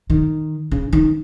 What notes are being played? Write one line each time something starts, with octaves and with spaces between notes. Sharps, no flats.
D#3
C#3
D#3